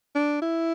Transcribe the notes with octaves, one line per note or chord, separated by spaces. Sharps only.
D4
E4